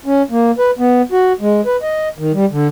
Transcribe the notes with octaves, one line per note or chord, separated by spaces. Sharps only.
C#4
A#3
B4
B3
F#4
G#3
B4
D#5
D#3
G3
D3